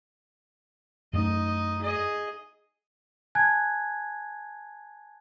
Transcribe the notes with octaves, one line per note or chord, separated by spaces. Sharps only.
F#2 A3 D4 D#4 D#5
G#4 D#5
G#5 A5 F#6 G#6